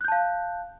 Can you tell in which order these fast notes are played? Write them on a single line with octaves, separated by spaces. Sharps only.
F#6 G6 A5 F5